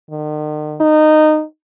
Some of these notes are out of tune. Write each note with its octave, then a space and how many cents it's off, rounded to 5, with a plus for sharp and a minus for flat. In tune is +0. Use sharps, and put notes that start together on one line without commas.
D#3 -45
D#4 -15